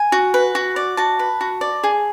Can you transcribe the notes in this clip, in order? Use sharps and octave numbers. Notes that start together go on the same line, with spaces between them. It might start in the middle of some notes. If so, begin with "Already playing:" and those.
Already playing: G#5
F#4
B4
F#4
D5
F#4 A5
B4
F#4
D5
G#4